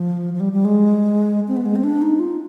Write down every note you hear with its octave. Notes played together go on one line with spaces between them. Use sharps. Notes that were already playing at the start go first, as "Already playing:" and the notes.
Already playing: F3
F3
G3
G3
G#3
C4
B3
G#3
C4
D4
D#4
F4